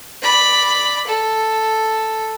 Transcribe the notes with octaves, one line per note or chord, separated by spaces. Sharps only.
D5 B5
A4